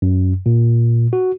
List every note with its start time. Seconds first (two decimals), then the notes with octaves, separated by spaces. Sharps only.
0.02 F#2
0.46 A#2
1.13 F#4